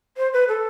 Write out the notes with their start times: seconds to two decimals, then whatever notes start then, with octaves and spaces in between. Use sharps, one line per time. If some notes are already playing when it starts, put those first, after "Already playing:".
0.17 C5
0.33 B4
0.48 A4